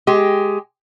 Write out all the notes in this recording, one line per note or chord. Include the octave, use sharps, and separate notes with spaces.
G#3 G4